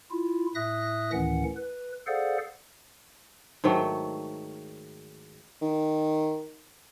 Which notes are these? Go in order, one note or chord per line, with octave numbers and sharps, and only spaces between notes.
E4 F4
A2 E5 D#6 F#6 A#6
D2 A2 D#3 E3 C#4 F#5
B4
G#4 A4 C5 D5 F5 F#5
G#2 D#3 F#3 A3
D#3